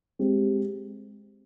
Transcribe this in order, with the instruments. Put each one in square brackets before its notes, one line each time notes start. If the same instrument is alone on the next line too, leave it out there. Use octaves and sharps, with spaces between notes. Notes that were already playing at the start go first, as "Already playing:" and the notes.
[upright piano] G#3 C4 G4